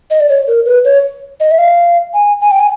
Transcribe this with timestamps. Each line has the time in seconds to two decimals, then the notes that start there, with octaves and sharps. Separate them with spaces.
0.11 D#5
0.20 D5
0.29 C#5
0.47 A#4
0.66 B4
0.85 C#5
1.40 D#5
1.51 E5
1.58 F5
2.14 G#5
2.41 G#5
2.51 G5
2.59 G#5